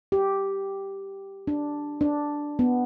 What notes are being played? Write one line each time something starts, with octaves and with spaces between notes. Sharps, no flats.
G4
D4
D4
B3